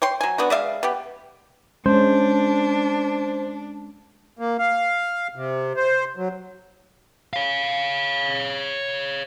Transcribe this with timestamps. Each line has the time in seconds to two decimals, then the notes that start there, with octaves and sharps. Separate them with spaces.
0.02 C#5 G5 C6
0.21 F#3 G#5
0.38 B3 D4 F#4
0.50 G#3 D5 E5 F5
0.83 B3 G4
1.86 G#3 C#4 D4 C5
4.39 A#3
4.59 F5
5.35 C3
5.77 C5
6.17 F#3
7.33 C#5 F5